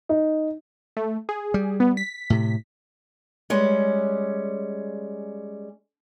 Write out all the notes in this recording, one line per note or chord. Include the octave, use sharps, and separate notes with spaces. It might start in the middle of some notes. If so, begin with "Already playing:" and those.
D#4
A3
G#4
G3
B3
B6
A2 C3
G3 G#3 C#4